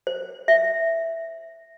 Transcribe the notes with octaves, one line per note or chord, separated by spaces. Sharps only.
C5
E5